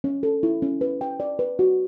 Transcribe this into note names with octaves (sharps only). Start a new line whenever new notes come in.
C#4
A4
E4
C#4
B4
G5
D5
B4
F#4